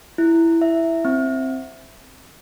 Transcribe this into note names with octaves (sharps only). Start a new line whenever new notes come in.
E4
E5
C4